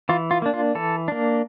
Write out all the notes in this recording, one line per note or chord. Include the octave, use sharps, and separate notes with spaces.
E3 F4
F4
A#3 D4
F4
E3 A4
A#3 D4